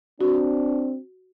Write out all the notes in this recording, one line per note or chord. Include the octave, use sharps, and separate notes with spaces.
C4 D4 F#4